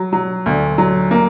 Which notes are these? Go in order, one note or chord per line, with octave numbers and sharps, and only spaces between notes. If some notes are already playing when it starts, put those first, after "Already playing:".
Already playing: F#3
F#3
D2
F#3
A#3